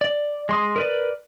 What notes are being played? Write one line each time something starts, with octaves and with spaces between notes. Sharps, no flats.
D5
G#3 C6 D#6
A#4 B4 D5